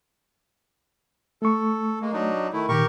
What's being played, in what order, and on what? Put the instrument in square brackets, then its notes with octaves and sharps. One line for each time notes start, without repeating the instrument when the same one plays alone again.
[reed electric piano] A3 C#6 [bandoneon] A4
[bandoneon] G#3 A#3
F#3 D4 D#4
D#3 A3 E4
[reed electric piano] A#2 D#3 [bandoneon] G4 A#4 C#6